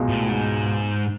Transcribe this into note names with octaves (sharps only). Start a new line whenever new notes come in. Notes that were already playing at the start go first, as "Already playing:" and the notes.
Already playing: C#2 B2 G#3
A2
G#2